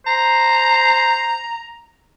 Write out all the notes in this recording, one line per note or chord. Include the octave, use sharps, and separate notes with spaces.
C5 A#5